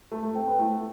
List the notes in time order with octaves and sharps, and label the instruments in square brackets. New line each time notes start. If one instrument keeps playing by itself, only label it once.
[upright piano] A3 [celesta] A4
[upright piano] A3
[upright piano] C4 [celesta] G5
[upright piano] B3
[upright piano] A3 [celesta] E4